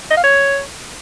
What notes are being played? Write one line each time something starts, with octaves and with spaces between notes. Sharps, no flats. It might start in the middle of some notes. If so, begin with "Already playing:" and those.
D#5
F5
C#5